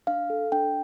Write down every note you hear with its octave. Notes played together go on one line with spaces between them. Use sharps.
D4 F5
A4
D4 G5